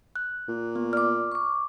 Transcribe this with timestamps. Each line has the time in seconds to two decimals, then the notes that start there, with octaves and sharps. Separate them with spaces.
0.16 F#6
0.49 A#2
0.76 B3
0.93 D5 D6 F6
1.32 C#6 D6